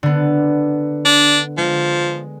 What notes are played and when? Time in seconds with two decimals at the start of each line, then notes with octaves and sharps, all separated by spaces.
0.03 D3 B3
1.05 D4
1.58 F3 G#3